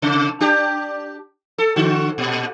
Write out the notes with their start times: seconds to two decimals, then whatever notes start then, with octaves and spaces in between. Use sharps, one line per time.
0.02 C3
0.41 D4 G4
1.58 A4
1.76 D3 F#4
2.18 A#2